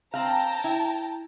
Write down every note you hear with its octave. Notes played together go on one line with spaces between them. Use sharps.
C4 F5 G5 A5 A#5
E4